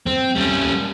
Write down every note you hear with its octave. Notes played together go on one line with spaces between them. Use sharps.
C4
G3 C#4